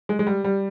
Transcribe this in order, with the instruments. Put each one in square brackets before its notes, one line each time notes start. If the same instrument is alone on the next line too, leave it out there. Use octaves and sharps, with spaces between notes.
[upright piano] G#3
G#3
G3
G3